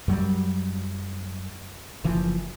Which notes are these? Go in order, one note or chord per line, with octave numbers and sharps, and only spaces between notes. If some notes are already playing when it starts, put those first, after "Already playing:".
F#2 F#3 G3
F#1 E3 F3